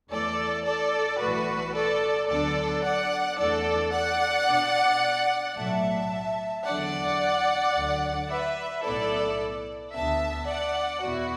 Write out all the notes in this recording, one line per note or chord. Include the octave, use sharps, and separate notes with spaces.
E2 E3 A3 A4 D5
A4 D5
B1 A2 E3 A3 F#4 B4
A4 D5
D2 D3 F#3 B3 D4 A4 D5
D5 F#5
E2 E3 A3 D4 A4 D5
D5 F#5
B2 B3 D4
B1 A2 F#3 A3 E5 A5
E2 D3 F#3 D4 D5 F#5
D2 D3 F#3
B4 E5
B1 A2 F#3 B3 E4 A4 D5
D2 D3 B3 E5 A5
D5 F#5
E2 B2 B3 E4 F#4